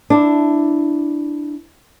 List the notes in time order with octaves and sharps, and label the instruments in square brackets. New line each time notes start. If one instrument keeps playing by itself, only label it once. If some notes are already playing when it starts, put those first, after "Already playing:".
[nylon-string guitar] D4 E4